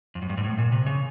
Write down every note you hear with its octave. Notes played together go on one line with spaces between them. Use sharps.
F2
F#2
G2
G#2
A2
A#2
C3
C#3